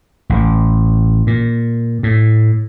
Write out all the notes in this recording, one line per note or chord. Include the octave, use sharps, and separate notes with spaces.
A1
A#2
A2